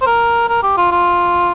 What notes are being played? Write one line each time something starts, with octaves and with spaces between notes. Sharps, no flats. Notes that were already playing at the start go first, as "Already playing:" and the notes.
C5
A#4
A#4
G4
F4
F4